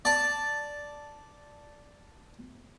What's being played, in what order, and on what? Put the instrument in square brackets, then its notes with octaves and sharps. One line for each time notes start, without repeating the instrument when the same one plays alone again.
[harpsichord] D5 A5